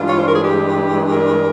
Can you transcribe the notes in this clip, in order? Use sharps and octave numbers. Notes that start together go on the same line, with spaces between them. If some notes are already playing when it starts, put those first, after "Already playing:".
Already playing: G2 E3 G#3 F4
C#5
C5
A#4
G#4
G4
A#4